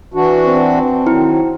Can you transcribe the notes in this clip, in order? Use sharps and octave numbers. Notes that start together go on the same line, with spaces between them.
E3 D4 F#4
C4
D#3 F#3 E4